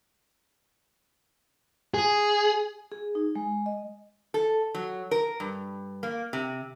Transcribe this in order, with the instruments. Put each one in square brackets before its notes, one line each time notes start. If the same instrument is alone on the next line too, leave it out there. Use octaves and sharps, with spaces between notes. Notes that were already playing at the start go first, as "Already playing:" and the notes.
[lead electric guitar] G#4
[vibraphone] G#4
D#4
G#3
D#5
[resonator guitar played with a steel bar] A4
F#3
A#4
G2
A#3
C3